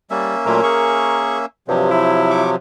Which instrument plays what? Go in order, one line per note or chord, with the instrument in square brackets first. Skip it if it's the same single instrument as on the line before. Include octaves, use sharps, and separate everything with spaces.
[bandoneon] G3 [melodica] A#3 C#4 E5
[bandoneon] A#2 F#3 A3 [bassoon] A#4
[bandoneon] G#4 C#6
[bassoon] G2 [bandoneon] C3 F3 F#3
[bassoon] E4
[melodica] C#6 D6